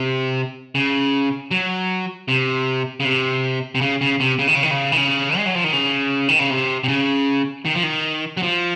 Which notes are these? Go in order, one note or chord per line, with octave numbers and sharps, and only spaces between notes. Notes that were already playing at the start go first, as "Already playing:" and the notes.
Already playing: C3
C#3
F#3
C3
C#3
C3
C3
C#3
C#3
C3
C#3
D#3
C#3
D#3
C#3
D#3
C#3
G#3
F#3
F3
D#3
C#3
D#3
C#3
C3
C3
C#3
D#3
F3
D#3
F#3
F3